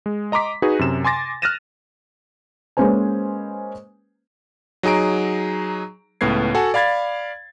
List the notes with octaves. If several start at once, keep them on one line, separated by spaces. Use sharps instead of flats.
G#3
D#5 A#5 C6 D6 B6
D#4 F#4 G#4 B4
F#2 C3 E7
G#5 C6 D6 A6 A#6
F6 F#6 A6 A#6 D#7 E7
G#3 A#3 C#4 B4 C5 G#5
F#3 D#4 G#4 A#5 D7
C#2 A2 B3 B4 G#6 C7
F#4 A4 F#5 G#5 A5
D5 F5 B5 G#6 A6